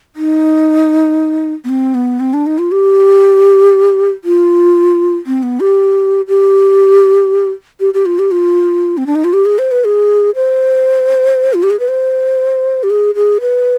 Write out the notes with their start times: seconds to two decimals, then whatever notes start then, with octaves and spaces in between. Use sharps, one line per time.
0.16 D#4
1.64 B3
1.69 C4
1.94 B3
2.20 C4
2.34 D4
2.46 D#4
2.59 F4
2.72 G4
4.24 F4
5.26 C4
5.43 B3
5.60 G4
6.28 G4
7.80 G4
7.94 G4
8.06 F4
8.19 G4
8.31 F4
8.97 C4
9.07 D4
9.15 D#4
9.24 F4
9.33 G4
9.45 G#4
9.59 C5
9.71 B4
9.85 G#4
10.35 C5
11.54 F4
11.63 G4
11.70 G#4
11.80 B4
11.88 C5
12.83 G4
12.90 G#4
13.15 G#4
13.41 B4